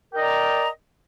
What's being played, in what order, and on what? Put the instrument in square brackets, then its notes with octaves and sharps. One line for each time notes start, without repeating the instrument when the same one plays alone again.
[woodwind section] A#4
G5
D#5
D5
A#5